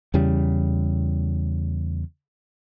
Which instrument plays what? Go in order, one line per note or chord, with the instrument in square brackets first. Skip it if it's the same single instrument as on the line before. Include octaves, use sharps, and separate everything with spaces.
[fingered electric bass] E2 C#3 G3